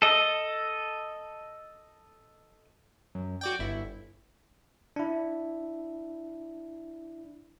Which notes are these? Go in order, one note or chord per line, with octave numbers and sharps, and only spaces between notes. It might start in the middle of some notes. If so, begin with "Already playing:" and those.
A4 D#5
F#2
F#4 D5 G5
G1 E4
D4 E4